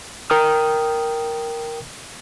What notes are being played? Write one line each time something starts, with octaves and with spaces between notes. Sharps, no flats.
A#4 G5 D#6 F6